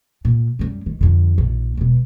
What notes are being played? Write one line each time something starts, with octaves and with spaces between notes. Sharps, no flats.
A#2
F#2 G3
D#3
F2 D3
A#1 D#3
E1 B2